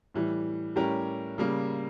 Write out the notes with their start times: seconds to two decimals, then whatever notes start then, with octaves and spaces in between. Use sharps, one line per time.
0.14 A2 E3 G3
0.76 A2 G3 C#4 G4 A#4
1.38 C#3 G3 A#3